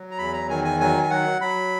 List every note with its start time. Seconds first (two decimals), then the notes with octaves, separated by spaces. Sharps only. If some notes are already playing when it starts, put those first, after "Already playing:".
Already playing: F#3
0.11 A#5
0.18 E2 B5
0.33 A#5
0.49 D#3 G#5
0.64 G#5
0.80 F#3 G#5
1.03 G#5
1.10 F#3 F#5
1.41 F#3 B5